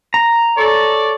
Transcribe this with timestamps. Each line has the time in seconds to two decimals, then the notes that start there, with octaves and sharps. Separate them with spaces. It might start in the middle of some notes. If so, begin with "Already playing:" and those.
0.14 A#5
0.57 A4 C#5 D5